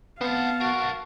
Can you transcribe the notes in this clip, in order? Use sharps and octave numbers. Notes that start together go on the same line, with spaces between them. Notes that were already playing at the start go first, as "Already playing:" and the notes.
B3 C4 F5 F#5 A5
B1 F#4 A#4